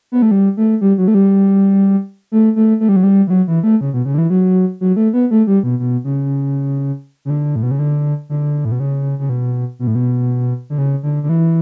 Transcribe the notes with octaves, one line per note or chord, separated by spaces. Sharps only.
B3
A3
G3
A3
G3
F#3
A3
G3
A3
A3
A3
G3
F#3
G3
E3
F#3
E3
A3
C#3
B2
C#3
D3
E3
F#3
F#3
A3
B3
A3
G3
B2
B2
C#3
C#3
D3
A2
B2
C#3
D3
D3
A2
B2
C#3
C#3
B2
B2
A2
B2
D3
C#3
D3
D3
E3